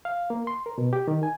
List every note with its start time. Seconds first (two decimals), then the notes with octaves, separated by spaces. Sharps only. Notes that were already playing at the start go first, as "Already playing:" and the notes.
0.05 F5
0.30 A#3
0.47 C6
0.66 A#4
0.78 B2
0.93 G4
1.08 D#3
1.23 G#5